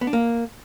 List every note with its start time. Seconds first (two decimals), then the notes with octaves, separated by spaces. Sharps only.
0.01 B3
0.07 D4
0.13 A#3